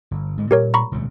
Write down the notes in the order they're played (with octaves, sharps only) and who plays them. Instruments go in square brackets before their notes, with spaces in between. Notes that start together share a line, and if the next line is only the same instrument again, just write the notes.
[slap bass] G1
G#2 D3 G#3
[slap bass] A#2 G3 [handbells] G4 A#4 C#5
[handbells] A#5 B5 C#6
[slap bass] D#1 C#2 C3